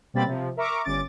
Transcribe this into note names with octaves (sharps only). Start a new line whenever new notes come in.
B2 G3 A#3 C4 B5 A6
C3 F3
A#4 E5 A#5 C#6 D6
G1 C#4 D6 A6